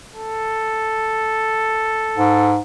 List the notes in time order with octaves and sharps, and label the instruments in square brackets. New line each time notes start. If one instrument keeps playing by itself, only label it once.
[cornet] A4
[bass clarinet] G#2